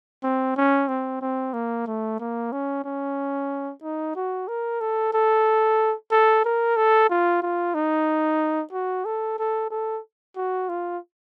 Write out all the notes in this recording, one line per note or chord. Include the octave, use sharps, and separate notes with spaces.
C4
C#4
C4
C4
A#3
A3
A#3
C#4
C#4
D#4
F#4
A#4
A4
A4
A4
A#4
A4
F4
F4
D#4
F#4
A4
A4
A4
F#4
F4